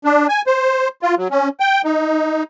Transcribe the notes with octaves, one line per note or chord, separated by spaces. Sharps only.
D4
G#5
C5
F4
F#3
C#4
G5
D#4